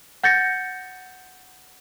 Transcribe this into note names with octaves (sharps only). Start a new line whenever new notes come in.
F#5 G6 A6 A#6 C#7